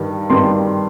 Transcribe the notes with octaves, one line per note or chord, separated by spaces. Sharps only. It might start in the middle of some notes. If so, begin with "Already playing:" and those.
Already playing: G2 D#3 G3
G2 D#3 G3 C6